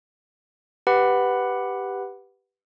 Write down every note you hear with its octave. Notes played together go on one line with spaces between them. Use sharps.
G4 B4 F#5 B5